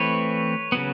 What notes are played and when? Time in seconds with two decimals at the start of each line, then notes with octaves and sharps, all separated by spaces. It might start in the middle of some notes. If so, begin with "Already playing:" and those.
Already playing: E3 A3 C4 B4 C#5
0.72 C#3 F#3 B3